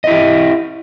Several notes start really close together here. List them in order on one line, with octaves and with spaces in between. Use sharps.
D#5 E4 G4